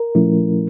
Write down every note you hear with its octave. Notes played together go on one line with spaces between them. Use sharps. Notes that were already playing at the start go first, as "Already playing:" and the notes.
Already playing: A#4
A#2 F3 A3 C#4 E4